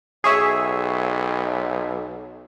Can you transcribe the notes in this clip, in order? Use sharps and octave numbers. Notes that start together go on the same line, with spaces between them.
B1 G#4 C#5 E5